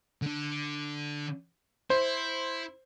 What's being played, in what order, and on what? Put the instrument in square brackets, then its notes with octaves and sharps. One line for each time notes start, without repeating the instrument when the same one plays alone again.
[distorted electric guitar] D3 D4
[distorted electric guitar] E4 [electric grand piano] C5